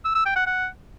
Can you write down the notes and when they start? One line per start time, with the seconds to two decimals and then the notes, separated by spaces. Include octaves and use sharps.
0.05 E6
0.15 E6
0.26 G5
0.36 F#5
0.47 F#5